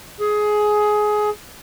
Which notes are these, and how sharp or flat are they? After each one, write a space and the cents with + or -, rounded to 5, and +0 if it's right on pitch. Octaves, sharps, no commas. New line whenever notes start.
G#4 +15